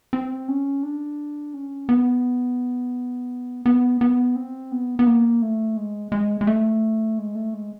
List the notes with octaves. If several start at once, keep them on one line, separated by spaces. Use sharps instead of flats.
C4
C#4
D4
C#4
B3
B3
B3
C4
B3
B3
A#3
A3
G#3
G#3
G#3
A3
G#3
A3
G#3